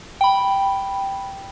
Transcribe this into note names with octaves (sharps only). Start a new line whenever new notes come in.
G5 B5